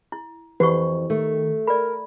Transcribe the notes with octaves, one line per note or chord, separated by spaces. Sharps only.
E4
F2 E3 F#4 G4 B4 C#6
D#3 A3
A#4 D5 B5